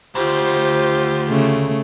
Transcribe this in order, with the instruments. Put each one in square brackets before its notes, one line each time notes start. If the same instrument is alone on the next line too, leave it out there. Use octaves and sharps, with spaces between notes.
[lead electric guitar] D2 [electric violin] F4 G4 [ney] C5
[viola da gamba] C#3 A3